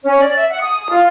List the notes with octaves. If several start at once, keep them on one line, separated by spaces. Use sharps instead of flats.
C#4
D5
E5
F#5
D#6
F4